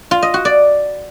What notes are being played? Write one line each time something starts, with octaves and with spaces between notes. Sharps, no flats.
F4
D#5
F#4
D5